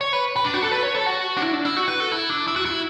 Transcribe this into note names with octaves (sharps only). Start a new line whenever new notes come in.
C#5
B4
B4
D4
F#4
A4
B4
C#5
A4
F#4
D4
E4
D4
E4
F#4
B4
A4
E4
D4
E4
F#4
E4